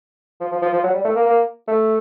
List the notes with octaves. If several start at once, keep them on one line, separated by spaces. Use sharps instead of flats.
F3
F3
F3
F3
F#3
G3
A3
A#3
A#3
A3